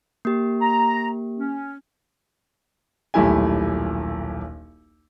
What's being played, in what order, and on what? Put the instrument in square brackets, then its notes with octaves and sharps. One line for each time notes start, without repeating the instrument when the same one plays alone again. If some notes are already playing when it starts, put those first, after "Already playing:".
[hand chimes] A#3 G4
[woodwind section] A#5
C#4
[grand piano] D#1 B1 A3 E4 G4 G#5